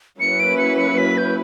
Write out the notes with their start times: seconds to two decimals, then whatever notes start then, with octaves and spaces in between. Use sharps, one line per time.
0.19 F#3 A#3 C#4 E4 B4 C#7
0.40 D7
0.58 C#7
0.78 C#7
0.98 B6
1.18 G6